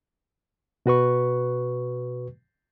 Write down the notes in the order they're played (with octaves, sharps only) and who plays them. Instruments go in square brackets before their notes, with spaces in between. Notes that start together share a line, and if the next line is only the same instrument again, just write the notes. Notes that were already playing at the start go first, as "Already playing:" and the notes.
[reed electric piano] B2 F#4 B4 C#6